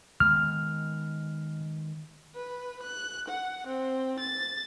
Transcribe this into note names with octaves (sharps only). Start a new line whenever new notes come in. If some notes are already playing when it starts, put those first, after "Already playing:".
D#3 G#3 B3 F6
B4
F#6
F#5
C4
A6